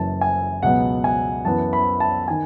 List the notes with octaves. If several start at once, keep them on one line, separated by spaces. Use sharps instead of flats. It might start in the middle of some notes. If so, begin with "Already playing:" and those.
Already playing: F#1 F#2 E3 A5
G#5
C#2 B2 F#3 B3 F#5
G#5
F#2 E3 B3 A5
B5
A5
D#3 G#5